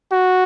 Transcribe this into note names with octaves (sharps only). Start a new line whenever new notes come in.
F#4